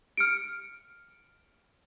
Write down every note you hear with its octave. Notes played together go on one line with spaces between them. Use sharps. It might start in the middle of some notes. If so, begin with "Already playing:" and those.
F6 C#7 D7